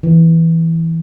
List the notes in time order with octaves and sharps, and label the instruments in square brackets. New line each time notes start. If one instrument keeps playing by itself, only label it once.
[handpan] E3